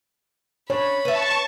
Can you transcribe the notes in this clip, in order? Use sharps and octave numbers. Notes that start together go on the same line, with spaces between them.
D4 C#5 B5
B4 E5 A5 C#6